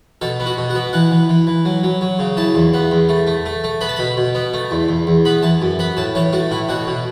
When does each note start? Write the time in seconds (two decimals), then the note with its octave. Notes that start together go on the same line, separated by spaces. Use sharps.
0.21 B2 A4
0.40 B3
0.46 F#4
0.58 B2
0.70 F#4
0.75 B3
0.93 E3 F#5
1.11 E3
1.29 E3
1.47 E3
1.65 F#3
1.84 F#3
2.01 F#3
2.19 C#3
2.37 E3 A5
2.55 E2
2.74 B3
2.91 E2
3.09 A3
3.27 A3
3.46 A3
3.64 A3
3.81 B3 B5
3.89 A5
3.96 B2 B5
4.17 B2
4.35 B3
4.54 A3
4.71 E2
4.89 E2
5.07 E2
5.25 B3 B5
5.43 E3 A5
5.62 F#2
5.79 B3 B5
5.97 A2 A5
6.15 E3 C#5
6.33 A3 F#4
6.51 A2 E4
6.69 B2 F#4
6.87 B2